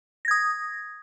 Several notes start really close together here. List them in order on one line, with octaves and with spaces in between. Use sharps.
A#6 G#6 D#6